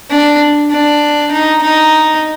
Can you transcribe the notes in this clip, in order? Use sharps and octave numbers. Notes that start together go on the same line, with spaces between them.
D4
D4
D#4
D#4